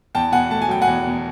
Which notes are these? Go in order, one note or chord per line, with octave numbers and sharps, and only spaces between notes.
E2 G5 A5
B2 F#5 G#5
A3 A5
G#5
F#3 G5
F#5 G#5
E2
B2